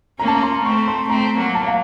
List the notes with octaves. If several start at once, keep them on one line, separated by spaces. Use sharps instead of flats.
A#3 C#4 A#5
A5
A#5
C6
A3 C4 C#6
C6
A3 C4 A#5
F#3 A#3
A5
F5